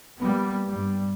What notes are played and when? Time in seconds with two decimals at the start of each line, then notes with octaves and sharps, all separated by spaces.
0.20 G3 A#3 B3
0.69 G2 G3